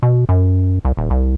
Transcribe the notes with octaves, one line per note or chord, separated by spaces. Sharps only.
B2
F#2
C2
D#1
C2